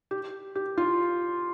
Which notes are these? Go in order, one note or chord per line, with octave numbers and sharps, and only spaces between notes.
G4
G4
F4